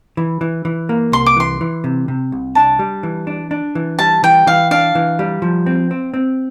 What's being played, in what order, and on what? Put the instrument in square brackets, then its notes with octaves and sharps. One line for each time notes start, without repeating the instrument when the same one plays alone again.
[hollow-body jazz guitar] E3
E3
E3
A#3
[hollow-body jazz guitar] C2 [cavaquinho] C6
[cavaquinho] D6
[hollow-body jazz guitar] E3 [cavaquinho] C6
[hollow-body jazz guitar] E3
C3
C3
C2
[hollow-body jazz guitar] D4 [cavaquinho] A5
[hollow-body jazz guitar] G3
E3
D4
D4
E3
[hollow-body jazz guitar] G3 [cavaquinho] A5
[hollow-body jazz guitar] E3 [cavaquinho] G5
[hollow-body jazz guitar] E3 [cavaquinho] F5
[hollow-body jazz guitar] D4 [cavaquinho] F5
[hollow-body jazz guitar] E3
G3
F3
C4
C4
C4